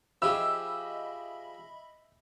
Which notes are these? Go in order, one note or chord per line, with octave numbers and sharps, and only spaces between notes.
F3 G4 G#4 D#5 E5 B5 E6